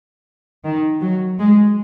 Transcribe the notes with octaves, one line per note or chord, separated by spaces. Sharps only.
D#3
F#3
G#3